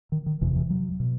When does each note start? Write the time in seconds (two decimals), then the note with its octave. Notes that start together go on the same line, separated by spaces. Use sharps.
0.12 D#3
0.26 D#3
0.41 F#1 E2 C3 E3
0.56 E3
0.70 F#3
1.00 B2